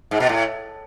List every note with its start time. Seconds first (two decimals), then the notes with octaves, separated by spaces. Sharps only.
0.11 G#2
0.20 B2
0.29 A2